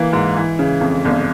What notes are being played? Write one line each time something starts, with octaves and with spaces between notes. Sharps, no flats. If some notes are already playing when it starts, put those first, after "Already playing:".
Already playing: E3 A#3
G#2
E3
C#3
F2
G1